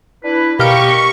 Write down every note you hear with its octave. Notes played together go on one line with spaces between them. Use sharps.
D4 E4 B4
B2 A#3 G4 D#5 F5 A#5 C#6 D7